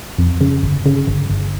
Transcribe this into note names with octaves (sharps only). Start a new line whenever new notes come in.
F2
C#3
G1
C#3
G1
G1